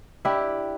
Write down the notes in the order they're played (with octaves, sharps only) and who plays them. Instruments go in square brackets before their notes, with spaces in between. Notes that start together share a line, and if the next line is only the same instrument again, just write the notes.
[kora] D4 E4 G4